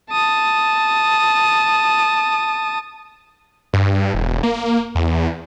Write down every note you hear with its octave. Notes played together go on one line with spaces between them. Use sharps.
A5 D#6
G2
E1
A#3
E2